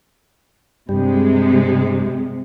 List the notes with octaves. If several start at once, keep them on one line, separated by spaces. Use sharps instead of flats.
G2 C3 G3 G#3